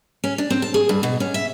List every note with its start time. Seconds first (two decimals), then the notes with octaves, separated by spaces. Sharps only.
0.24 C#4
0.38 D4
0.50 C4
0.62 A5
0.74 G#4
0.89 G2
1.03 B2
1.20 C#4
1.34 E5